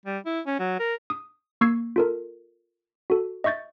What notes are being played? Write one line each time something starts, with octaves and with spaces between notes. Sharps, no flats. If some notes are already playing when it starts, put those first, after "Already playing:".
G3
E4
C#4
F#3
A#4
D#6
A#3 C#6 E6 G#6 C7
F4 A4 A#4
F#4 A4
D#5 E5 C#6 G6 A6